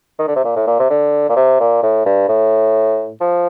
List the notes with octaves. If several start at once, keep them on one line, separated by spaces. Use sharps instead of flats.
D#3
D3
C3
A#2
A2
A#2
C3
D3
A#2
C3
A#2
A2
G2
A2
F3